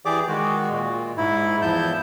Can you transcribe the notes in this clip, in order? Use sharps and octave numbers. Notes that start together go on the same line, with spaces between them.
E3 G4 G#4 D5 D6
D#3 G#3 F#4
A#2
G#2 E4
E2 F3 E4 A5 G6